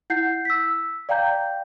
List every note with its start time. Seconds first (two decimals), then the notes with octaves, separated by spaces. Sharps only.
0.10 E4 F#5 G6 C7
0.45 E6 B6
1.09 D5 F5 G5 A#5 G6